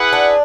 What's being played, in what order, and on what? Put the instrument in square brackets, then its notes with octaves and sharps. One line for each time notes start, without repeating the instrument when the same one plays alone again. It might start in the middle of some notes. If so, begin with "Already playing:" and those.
Already playing: [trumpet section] E4 G#4 B4 F#5
[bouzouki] D4